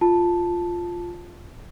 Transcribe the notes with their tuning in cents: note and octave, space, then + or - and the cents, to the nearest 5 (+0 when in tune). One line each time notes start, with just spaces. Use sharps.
F4 +0 A5 +0